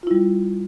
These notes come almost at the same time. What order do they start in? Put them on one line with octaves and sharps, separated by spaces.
F4 E4 G3